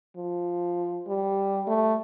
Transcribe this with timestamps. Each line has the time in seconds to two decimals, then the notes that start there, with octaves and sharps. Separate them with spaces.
0.16 F3
1.07 G3
1.67 A3